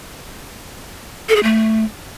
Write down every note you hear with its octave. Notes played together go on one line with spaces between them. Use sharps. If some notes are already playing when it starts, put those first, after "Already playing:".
A4
G#4
A3